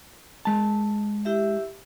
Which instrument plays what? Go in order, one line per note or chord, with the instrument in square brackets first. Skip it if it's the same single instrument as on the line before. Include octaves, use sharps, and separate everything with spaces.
[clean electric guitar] G#3 A5
[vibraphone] E4 G4 E5